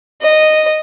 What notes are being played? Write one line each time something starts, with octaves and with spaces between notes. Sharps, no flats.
D#5